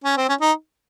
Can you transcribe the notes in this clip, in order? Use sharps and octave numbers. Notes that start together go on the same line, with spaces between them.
C#4
C4
C#4
D#4